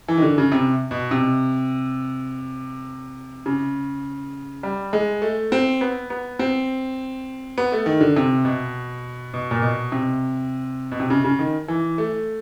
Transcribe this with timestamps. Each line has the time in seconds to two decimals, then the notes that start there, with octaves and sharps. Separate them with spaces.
0.08 E3
0.17 D#3
0.22 D3
0.38 C#3
0.52 C3
0.91 B2
1.11 C3
3.46 C#3
4.63 G3
4.93 G#3
5.22 A3
5.52 C4
5.81 B3
6.10 B3
6.39 C4
7.58 B3
7.72 A3
7.86 D#3
8.01 D3
8.16 C3
8.45 B2
9.34 B2
9.51 A#2
9.62 B2
9.92 C3
10.92 B2
11.00 C3
11.10 C#3
11.24 C#3
11.39 D#3
11.68 E3
11.98 A3